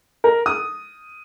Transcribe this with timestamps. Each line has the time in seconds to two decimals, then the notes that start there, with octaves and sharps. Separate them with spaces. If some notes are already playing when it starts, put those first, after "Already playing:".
0.24 A#4
0.46 D#6